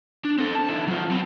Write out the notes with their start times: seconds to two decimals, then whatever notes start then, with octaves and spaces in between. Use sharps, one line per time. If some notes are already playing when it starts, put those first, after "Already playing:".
0.25 D4
0.38 C4 A4
0.56 A5
0.69 D3 E3
0.88 F#3 F4
1.11 B3 C4